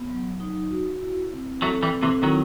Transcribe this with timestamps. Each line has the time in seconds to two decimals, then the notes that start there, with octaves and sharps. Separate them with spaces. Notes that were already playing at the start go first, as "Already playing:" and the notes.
Already playing: B3
0.10 F#3
0.40 D#4
0.70 F#4
1.01 E4
1.32 C4
1.62 F#3 A3 A4
1.83 E3 G3
1.93 C4
2.03 C3 E3
2.23 D#3 F#3 E4